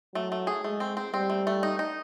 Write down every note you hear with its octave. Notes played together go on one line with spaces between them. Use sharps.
F#3 A3
A3
G#4
G#3 A3
C4
C4
G3 C4
A3
A3
D#4
D#4